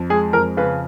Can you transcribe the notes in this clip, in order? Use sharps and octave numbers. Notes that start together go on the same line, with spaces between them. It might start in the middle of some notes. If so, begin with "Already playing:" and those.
Already playing: F2
G#3 G#4
F2 A#4
C#3 B4